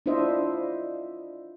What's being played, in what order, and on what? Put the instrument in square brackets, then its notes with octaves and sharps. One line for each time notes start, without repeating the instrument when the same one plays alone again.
[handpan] D4 E4 F4 C5 D#5 E5